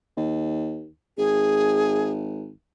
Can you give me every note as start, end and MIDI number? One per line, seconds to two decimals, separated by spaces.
0.17 0.88 39
1.17 2.51 32
1.17 2.11 68